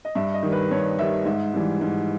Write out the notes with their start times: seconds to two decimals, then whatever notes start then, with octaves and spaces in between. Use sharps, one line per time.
0.05 D#5
0.15 G2 E5
0.34 D#5
0.43 D#3 G3
0.52 B4
0.71 G2 C#5
0.98 D#3 G3 E5
1.25 G#2 E5
1.54 E3 G3
1.81 G#2